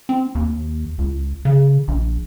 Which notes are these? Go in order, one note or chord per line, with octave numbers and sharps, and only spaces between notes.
C4
D#2
C#2
C#3
A#1